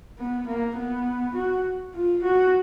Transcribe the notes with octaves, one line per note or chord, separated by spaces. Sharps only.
B3
A#3
B3
F#4
F4
F#4